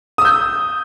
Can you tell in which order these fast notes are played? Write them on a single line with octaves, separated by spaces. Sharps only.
D#6 E6 G6